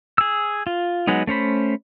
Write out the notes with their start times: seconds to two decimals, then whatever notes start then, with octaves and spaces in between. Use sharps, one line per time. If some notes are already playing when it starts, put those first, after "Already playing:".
0.18 G#4 E6
0.67 F4
1.07 F#3 G#3 B3 D#4
1.27 A3 C#4 C5 B5